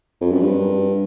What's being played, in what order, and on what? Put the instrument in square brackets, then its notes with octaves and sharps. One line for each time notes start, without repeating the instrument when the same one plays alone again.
[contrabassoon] F2
F#2
G2